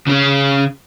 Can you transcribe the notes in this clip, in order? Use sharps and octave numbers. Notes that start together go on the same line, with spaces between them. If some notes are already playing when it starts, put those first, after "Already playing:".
C#3 C#4